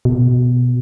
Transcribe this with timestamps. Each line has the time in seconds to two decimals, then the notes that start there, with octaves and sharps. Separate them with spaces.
0.05 B2